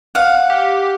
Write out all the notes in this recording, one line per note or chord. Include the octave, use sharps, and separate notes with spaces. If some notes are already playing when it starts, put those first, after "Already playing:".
F5 F#5
G4